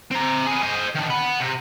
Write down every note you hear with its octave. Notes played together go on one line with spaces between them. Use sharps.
C4 A#5
B3 G#4
C5 D#5
D#3 D4
F#5 B5
C3